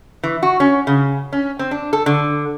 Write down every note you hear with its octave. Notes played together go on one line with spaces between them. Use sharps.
E3
F#4
C#4
C#3
C#4
C4
D4
A4
D3